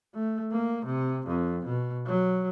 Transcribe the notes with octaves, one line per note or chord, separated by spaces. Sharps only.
A3
A#3
C3
F2
B2
F#3